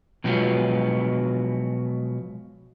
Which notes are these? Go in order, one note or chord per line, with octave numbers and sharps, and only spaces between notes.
B2 F3 F#3 G#3 B3